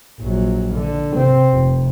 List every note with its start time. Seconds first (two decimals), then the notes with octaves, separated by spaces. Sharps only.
0.20 A#1 F#3
0.75 D3
1.16 C3 C4
1.51 F1